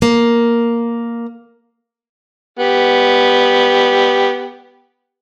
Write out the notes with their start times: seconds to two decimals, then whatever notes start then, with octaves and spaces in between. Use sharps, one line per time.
0.02 A#3
2.59 B3 G4